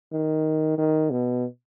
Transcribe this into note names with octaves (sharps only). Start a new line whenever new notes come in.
D#3
D#3
B2